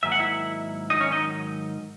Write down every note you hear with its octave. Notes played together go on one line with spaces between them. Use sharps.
G#2 D#3 F#3 A#3 E5
F#5
E4 E5
G#2 D#3 F#3 D#4 D#5
C#4 C#5
D#4 D#5